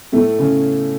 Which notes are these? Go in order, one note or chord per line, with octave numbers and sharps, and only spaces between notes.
A2 A3
C#3 C#4